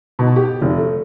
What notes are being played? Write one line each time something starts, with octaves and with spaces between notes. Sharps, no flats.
B2
G4
F1
A3